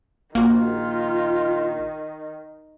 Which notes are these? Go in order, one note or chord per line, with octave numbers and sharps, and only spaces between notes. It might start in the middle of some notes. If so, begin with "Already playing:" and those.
A#1 D#3 A#3 F4 F#4